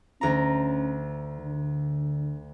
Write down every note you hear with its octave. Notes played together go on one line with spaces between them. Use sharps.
D2 C#4 A#5
D3